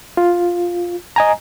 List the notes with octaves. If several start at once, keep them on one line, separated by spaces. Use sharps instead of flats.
F4
D#5 G#5 A#5